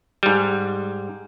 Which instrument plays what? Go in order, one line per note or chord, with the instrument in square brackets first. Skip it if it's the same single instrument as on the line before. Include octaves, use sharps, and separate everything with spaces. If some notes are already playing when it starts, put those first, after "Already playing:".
[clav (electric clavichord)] G#2 G3